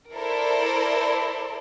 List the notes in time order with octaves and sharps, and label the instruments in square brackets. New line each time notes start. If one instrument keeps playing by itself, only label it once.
[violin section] E4 A4 A#4 C5 D5